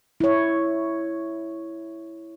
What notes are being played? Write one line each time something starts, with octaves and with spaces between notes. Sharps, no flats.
E4 C#5